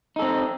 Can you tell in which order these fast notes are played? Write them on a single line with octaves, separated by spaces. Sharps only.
D#4 A4 C4